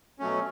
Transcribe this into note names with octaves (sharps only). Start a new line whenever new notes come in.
B2 F#3 A3 C#4